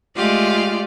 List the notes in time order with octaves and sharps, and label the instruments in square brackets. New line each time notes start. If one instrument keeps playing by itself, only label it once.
[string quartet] G#3 A3 F4 G4 D5 F5